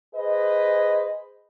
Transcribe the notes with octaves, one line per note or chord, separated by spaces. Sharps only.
G#4 B4 C5 D#5